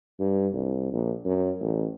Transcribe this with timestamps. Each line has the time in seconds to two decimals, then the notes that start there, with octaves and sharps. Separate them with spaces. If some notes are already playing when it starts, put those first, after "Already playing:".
0.20 G2
0.53 C2
0.92 A#1
1.25 F#2
1.61 A1